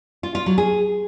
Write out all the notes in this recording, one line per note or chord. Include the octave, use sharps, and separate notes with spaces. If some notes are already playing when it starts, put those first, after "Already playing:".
F4
F4
F#3
G#4